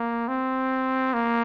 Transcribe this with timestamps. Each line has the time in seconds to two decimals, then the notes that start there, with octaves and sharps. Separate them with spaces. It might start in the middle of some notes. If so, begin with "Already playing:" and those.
Already playing: A#3
0.28 C4
1.13 A#3